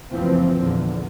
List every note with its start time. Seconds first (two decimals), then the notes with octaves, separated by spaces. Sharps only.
0.12 F#1 D2 E3 F3 C4
0.59 A#1 E2 D3